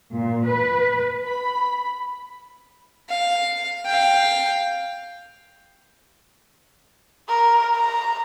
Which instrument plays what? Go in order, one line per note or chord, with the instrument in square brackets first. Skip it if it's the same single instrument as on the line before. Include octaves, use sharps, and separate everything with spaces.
[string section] A#2
B4
B5
[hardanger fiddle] F5
F5 G5
[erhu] A#4
A#5